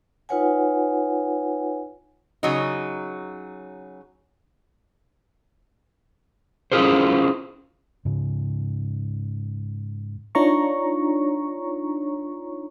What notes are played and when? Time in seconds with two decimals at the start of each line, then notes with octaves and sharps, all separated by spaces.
0.29 D#4 F4 B4 C#5 F#5 G#5
2.43 C#3 F#3 D#4
6.72 C#4 E4 F4 G#4 A#4 C5
8.05 G#2 C#3
10.35 D4 D#4 F4 C#5 A#5 C#6